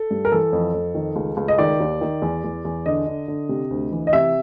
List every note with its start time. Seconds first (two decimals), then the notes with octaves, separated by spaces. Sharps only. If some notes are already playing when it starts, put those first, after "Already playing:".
Already playing: A4
0.11 G2
0.25 A#4
0.32 E3 A4
0.53 F2
0.74 F2
0.95 D#3
1.16 C#2
1.37 C#2
1.48 D#5
1.58 D#3 D5
1.80 D#2
2.01 D#3
2.22 E2
2.44 E2
2.65 E2
2.86 D3 D#5
3.07 D3
3.28 D3
3.49 C3
3.71 D2
3.92 E3
4.07 D#5
4.13 C3 E5